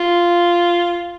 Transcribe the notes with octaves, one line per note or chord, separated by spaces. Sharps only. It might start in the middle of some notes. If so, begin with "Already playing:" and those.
Already playing: F4